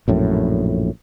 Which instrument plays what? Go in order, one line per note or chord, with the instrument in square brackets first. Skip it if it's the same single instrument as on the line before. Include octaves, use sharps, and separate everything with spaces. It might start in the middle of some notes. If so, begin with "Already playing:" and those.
[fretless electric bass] A#1 F#2 A2